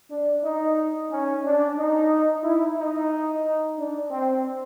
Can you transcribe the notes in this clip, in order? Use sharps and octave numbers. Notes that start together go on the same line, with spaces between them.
D4
D#4
C#4
D4
D#4
E4
D#4
D4
C4